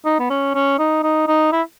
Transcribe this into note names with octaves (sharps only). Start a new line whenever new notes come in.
D#4
B3
C#4
C#4
D#4
D#4
D#4
E4